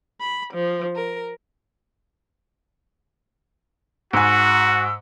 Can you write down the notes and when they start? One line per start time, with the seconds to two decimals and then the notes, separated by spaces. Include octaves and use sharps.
0.21 B5
0.55 F3
0.96 A#4
4.13 G#2 F#4 G#5 E6